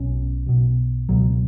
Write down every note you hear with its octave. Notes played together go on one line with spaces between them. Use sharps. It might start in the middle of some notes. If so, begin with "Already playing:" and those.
Already playing: B1 B2 C#4
B1 B2
C#2 B2 F#3